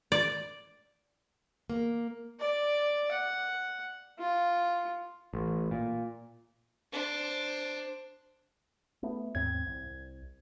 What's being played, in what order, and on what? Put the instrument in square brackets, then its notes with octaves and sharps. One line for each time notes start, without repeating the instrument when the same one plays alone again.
[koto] D5
[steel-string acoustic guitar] A#3
[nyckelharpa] D5
F#5
F4
[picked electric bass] A1
A#2
[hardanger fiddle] D4 C5
[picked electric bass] A3 B3
[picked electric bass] D#2 G#2 C4 [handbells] G#6
[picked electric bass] C2